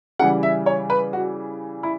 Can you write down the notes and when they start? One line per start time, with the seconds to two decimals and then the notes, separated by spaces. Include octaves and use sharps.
0.19 C#3 E3 G3 F#5
0.43 E5
0.66 C#5
0.90 B4
1.13 F#4
1.83 E4